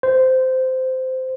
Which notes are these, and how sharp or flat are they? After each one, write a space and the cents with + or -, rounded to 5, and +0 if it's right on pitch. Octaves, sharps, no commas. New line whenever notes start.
C5 -15